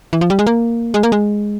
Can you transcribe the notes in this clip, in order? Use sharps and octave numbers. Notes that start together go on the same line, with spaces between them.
E3
F3
G3
G#3
A#3
G#3
A#3
G#3